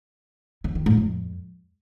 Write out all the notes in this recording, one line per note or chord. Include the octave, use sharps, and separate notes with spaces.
D3
D#3
A2
F2